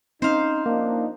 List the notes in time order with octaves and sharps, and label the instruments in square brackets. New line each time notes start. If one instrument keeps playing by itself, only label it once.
[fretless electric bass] C4 C#4 [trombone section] D#4 [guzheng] C5 F5
[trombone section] F3 D4 D#4 [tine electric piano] A#3